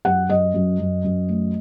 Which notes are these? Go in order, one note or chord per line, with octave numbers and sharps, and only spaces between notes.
F#2 F#5
F#2 D#5
F#2
F#2
F#2
A3